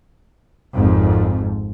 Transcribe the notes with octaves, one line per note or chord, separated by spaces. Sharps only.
G#1 F2 G#2